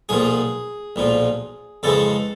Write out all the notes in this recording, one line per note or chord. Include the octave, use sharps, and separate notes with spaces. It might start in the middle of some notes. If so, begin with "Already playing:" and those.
B1 A#2 F3 G#4
B1 A#2 F3
F2 C#3 E3 G#3 A4